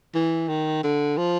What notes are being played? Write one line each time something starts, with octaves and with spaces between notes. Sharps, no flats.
E3
D#3
D3
F3